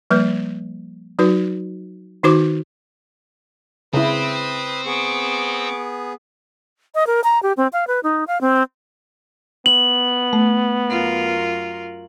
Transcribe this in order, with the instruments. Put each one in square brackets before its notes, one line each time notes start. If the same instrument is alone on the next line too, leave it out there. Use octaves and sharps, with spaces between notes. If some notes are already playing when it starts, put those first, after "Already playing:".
[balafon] F3 G3 A#3 B4
F#3 D#4 F#4 B4
D#3 D#4 F#4 C5 D6
[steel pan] C#3 E4 [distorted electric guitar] C4 [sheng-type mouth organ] B4 D#6
[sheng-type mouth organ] B3 G#4 [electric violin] C#6 D6
[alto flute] D#5
A#4
A#5
G4
C4
F5
B4
D#4
F5
C4
[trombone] B3 [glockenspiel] F#7
[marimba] A3
[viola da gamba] F#2 F4 A#4